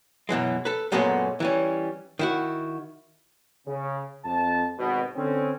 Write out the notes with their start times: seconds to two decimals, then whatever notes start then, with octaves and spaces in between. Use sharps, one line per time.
0.29 F#2 B2 E3 G#3
0.65 A4 B4
0.92 F#2 A#2 G#3 A3 B3 C#4
1.40 E3 G3 C#4
2.19 D#3 E4 F#4
3.67 C#3
4.25 F2 A5
4.79 G#1 B2
5.16 D3 C4 C#4